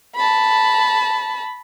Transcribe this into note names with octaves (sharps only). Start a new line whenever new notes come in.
A5 B5